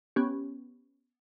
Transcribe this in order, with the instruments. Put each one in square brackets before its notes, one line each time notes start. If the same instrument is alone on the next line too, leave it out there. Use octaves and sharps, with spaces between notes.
[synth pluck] B3 C#4 G4